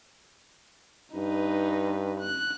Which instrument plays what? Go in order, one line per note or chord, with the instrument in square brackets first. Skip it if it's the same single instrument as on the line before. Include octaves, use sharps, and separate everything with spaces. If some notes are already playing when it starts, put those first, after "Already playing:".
[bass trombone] G2 [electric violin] D#4 B4
[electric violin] F#6